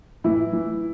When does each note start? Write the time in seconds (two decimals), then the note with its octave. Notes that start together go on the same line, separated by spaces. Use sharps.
0.24 A2 E3 E4
0.53 E3